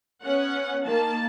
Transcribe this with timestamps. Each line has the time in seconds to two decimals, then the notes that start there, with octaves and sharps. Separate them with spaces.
0.22 B3 C#4 F#5
0.84 D#3 A#3 A5